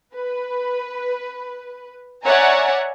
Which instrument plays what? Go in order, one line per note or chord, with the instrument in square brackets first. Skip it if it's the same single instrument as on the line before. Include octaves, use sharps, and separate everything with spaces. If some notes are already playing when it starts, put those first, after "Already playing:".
[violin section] B4
C#5 D5 E5 F#5 G#5 A#5